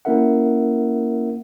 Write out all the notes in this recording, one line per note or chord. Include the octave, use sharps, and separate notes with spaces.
A#3 C#4 E4 A#4 E5 F#5